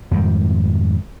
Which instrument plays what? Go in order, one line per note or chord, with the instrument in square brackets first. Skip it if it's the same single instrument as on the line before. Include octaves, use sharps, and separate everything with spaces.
[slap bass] F2 G#2 D#3 G3